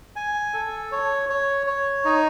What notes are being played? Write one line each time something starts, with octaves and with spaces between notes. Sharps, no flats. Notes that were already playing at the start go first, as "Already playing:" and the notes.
G#5
A4
C#5
C#5
C#5
D#4